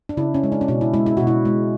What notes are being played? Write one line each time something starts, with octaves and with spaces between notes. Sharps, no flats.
D4
C#3 E4
C#4
G#3
D4
C#4
B2 D4
E4
G#3 E4
E4
B2 F#4
E4
G#3